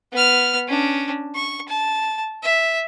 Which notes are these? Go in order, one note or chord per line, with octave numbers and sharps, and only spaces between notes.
B3 F6
C#4 D4
C#6
A5
E5